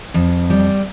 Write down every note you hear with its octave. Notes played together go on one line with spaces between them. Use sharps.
F2
G3